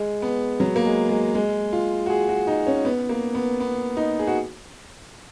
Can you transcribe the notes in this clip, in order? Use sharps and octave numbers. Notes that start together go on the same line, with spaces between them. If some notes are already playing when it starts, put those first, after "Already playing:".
Already playing: G#3
B3
F#3
A#3
G#3
G#3
G#3
F4
F#4
G#4
F#4
D#4
C#4
B3
A#3
B3
B3
D#4
G#4
F#4